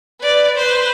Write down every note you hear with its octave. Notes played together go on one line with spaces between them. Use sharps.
B4 D5
B4 C5